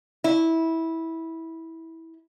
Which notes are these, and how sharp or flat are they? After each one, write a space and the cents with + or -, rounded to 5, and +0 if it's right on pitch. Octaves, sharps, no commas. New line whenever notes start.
E4 -15